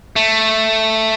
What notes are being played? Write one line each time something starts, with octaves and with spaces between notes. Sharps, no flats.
A3